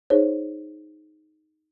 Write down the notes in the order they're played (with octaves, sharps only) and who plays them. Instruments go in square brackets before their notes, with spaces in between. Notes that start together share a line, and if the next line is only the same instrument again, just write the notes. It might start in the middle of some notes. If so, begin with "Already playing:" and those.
[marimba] D#4 G#4 C5 C#5